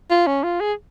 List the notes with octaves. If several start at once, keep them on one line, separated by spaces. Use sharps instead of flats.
F4
C#4
F4
G#4